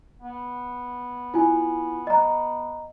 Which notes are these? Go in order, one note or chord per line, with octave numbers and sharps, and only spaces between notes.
B3
E4 F4 G#5
D#5 A#5